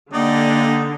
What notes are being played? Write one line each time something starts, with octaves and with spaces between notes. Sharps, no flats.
D3 A#3 D#4 G4 D5 D#5